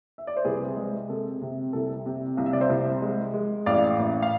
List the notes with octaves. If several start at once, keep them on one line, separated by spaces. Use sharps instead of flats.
E5
D5
C5
C2 G#4 B4
G#3
C3 A4
C3
C2 A4
C3
C2 F5
E5
D5
C5 E5
C2
G#3
G#3
A1 D5 F5
A1
F5